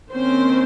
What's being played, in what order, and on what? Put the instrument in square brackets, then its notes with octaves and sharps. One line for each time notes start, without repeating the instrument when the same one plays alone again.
[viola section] D#3 A#3 C4 C#4 C5